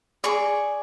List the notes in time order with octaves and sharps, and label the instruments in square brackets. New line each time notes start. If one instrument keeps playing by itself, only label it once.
[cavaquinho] G#4 D5 C#6